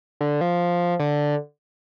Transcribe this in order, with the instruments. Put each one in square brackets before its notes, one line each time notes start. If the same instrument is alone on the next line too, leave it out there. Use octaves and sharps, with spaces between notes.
[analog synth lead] D3
F3
D3